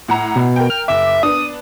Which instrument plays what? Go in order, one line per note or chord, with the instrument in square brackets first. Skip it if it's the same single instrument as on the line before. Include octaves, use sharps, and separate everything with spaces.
[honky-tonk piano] A2 F#5 A#5
[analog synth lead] B2
[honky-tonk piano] A#4 G5
[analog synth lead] F6
[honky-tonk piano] F#1 D6 [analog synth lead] E5
[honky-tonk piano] B3 D4 [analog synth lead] D#6